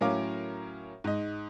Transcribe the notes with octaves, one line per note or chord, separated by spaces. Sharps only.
A2 F#3 C#4 A#4 F5 D6
G#2 D#5